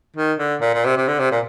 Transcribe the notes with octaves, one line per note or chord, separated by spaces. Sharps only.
D#3
D3
A#2
A#2
C3
C3
D3
C3
A#2